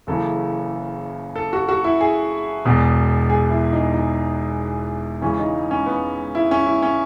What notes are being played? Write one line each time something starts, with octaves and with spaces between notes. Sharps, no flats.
F#1 F#2 C#3 E3 A4
A4
F#4
F#4
E4
G#4
E1 E2 B2
G#4
E4
D#4
D#4
C#2 C#3 E3 C#4
D#4
C#4
B3
E4
C#4
E4
C#4